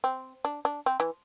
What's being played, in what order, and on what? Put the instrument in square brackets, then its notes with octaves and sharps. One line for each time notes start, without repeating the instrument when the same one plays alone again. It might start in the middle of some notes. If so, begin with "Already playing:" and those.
[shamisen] C4
D4
D4
C4
E3